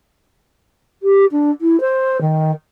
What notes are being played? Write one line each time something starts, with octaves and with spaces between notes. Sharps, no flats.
G4
D4
E4
C5
D#3